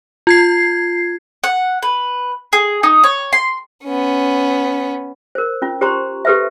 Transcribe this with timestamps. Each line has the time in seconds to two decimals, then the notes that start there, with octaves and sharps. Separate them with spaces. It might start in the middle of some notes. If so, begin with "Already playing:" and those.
0.27 F4 G#6 C7
1.44 F#5
1.83 B4
2.53 G#4
2.83 D#4
3.04 C#5
3.33 C6
3.85 B3 C#4
5.35 A#4 C5
5.62 C#4 F4
5.81 G4 C5 A#5 C6 C#6
6.25 G4 A4 B4 C5 E5